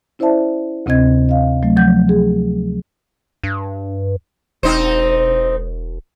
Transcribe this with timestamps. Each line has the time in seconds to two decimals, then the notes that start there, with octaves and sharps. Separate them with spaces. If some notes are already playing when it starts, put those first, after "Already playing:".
0.19 C#4 E4 C5 D5 E5 A5
0.86 D2 C3 C4 D#5 G#6
1.29 D#5 F5
1.63 F#3 A3
1.77 F3 F#3 F#5 G6
2.09 G#4
3.43 G2
4.63 E1 C4 D#4 C5